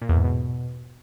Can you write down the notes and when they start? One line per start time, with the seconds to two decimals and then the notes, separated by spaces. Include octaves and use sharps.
0.02 A#2
0.09 E2
0.17 G#2
0.24 B2